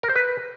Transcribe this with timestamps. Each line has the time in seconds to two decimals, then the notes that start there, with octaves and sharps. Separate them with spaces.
0.03 A#4
0.09 C5
0.16 B4